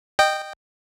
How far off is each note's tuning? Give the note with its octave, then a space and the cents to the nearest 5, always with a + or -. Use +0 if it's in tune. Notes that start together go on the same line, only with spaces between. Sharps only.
D#5 -20 G5 +0